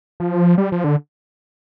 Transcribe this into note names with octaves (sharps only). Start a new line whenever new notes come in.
F3
G3
F3
D3